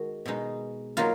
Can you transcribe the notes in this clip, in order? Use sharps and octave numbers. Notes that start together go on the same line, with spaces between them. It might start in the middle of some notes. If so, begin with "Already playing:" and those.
Already playing: D#3 G#3 F#4
B2 G#3 D#4
F#3 A#3 D#4 F4